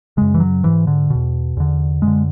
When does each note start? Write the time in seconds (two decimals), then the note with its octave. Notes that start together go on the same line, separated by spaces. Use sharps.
0.17 F#2 C#3 G#3
0.34 E3
0.40 F#3
0.63 G#2 E3
0.87 D3
1.10 E2 B2
1.57 E2 D3
2.02 F#2 D3 G#3